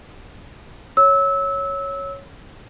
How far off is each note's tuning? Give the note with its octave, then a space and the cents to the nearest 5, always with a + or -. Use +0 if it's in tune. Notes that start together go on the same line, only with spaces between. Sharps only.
C#5 +0 E6 -20